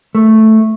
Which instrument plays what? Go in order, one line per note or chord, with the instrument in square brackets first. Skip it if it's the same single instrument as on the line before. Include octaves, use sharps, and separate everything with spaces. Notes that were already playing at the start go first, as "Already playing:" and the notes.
[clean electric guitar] A3